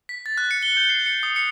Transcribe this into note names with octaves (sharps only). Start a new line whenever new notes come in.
B6
A6
F#6
C#7
G7
G6
C7
C#7
D#6
C#7